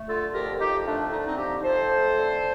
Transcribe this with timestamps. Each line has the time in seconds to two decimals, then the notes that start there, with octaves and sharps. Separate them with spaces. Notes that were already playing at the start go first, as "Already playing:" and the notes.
Already playing: A3
0.08 D3 F4 A4
0.34 F2 G4 A#4
0.60 F2 D#4 G4
0.86 A3 D4
1.12 D3 D#4
1.19 D4
1.26 C4 D#4
1.38 F2 D#4 G4
1.64 F2 A4 C5
1.90 A3
2.16 D3